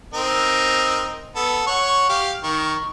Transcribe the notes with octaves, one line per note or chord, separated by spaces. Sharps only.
C4 D#4 A#4
B3 A4
C#5 F#5 C#6
G4 F5
D#3 C#6